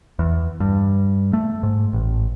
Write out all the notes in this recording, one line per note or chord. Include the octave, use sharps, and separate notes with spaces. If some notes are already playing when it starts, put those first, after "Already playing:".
E2
G2
A3
G#2
A1